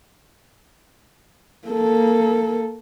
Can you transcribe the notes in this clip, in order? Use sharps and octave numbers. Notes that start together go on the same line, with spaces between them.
A#3 A4